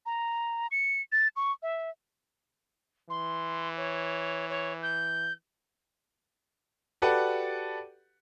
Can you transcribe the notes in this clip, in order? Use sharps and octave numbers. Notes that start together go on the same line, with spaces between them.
A#5
C#7
A6
C#6
E5
E3 C6
C#5
C#5
G6
F#4 G4 A4 B4 D5 F#5